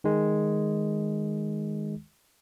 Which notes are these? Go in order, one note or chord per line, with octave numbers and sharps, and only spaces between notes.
D#3 G#3